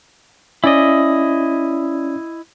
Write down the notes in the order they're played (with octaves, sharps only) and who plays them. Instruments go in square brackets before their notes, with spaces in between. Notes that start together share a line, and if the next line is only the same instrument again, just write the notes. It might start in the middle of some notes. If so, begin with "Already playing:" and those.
[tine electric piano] C#4 D5 [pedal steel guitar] E4 D#5